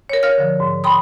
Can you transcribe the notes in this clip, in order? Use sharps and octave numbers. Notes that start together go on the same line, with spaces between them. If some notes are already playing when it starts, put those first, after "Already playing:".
A#4 C#5
A#4 C#5 F5 F6
D3 F3
G#2
G5 B5 C6 D#6